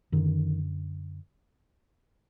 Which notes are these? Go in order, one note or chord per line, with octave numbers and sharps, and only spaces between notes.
F#2 D3 D#3